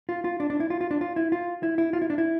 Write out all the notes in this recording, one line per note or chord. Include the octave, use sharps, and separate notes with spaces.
F4
F4
D4
D4
E4
F4
F4
D4
F4
E4
F4
E4
E4
F4
E4
D4
E4